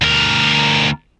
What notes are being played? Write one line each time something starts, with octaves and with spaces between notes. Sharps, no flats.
D2 A#4